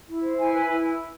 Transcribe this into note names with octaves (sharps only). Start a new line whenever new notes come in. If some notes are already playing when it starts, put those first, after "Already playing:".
E4
C5
E4 G#5
B4
E4